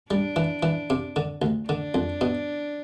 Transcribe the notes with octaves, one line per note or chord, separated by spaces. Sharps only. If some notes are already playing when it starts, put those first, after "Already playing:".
G3 D4
E3
E3
C3
D3
D2
D3 D4
F2
B2